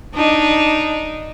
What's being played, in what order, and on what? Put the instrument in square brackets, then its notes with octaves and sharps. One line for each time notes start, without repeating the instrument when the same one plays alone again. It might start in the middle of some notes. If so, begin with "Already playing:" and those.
[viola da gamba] D4 D#4